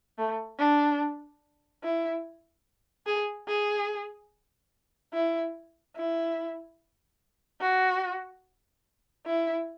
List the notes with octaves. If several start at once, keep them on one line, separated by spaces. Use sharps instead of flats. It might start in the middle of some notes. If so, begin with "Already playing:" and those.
A3
D4
E4
G#4
G#4
E4
E4
F#4
E4